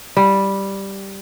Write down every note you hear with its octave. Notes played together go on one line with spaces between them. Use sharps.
G3